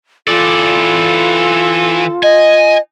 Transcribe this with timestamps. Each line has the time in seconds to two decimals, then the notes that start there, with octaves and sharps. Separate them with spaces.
0.28 E3 C4 F4 A4 D5
2.23 D#5 G#5